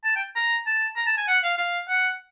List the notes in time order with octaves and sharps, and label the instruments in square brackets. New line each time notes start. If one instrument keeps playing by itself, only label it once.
[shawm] A5
G5
A#5
A5
A#5
A5
G#5
F#5
F5
F5
F#5